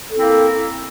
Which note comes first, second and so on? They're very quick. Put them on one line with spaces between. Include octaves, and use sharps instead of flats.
A4 C4 E4 A#3